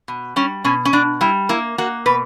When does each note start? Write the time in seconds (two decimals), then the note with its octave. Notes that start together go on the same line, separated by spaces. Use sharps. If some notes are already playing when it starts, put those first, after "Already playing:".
0.08 B2
0.36 G3 C#4
0.64 B2 C#4
0.85 C#4
0.93 B2 D4
1.21 G3 E4
1.49 A#3 E4
1.78 A#3 F#4
2.06 B2 B4